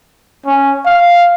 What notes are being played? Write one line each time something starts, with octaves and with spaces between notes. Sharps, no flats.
C#4
F5